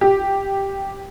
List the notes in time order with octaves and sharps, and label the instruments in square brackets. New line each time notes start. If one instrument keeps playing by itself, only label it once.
[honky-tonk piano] G4